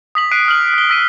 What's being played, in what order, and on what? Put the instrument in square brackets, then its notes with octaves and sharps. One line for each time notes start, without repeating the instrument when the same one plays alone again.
[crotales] D#6 B6 F#7
F#6 B6 C7 D7 D#7
F6 F#7
F#6 G7
E6 B6 D#7